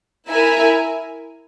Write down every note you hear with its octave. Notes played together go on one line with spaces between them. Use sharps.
E4 A#4 E5 G#5